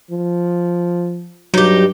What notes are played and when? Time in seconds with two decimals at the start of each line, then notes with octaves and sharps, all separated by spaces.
0.11 F3
1.54 G2 F#3 D#4 G4